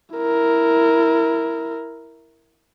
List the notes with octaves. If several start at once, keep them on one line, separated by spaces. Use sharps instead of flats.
E4 A#4